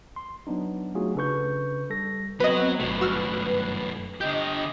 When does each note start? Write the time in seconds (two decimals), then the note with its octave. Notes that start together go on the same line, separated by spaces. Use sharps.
0.16 C6
0.47 F#3 B3 D4 D#4
0.95 F#3 A3 D#4 F4 F#4 G#4
1.15 C#3 D4 A4 B4 C#6 G6
1.90 G3 A4 A#6
2.40 F#3 B3 C4 B4 D#5
2.80 G1 F#2 B2 A3 B4
3.01 F#4 E6 F6
4.21 D3 G4 D#5 G6